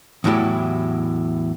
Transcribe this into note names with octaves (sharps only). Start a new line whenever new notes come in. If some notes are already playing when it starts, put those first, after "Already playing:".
E2 A2 F#3 E4 G4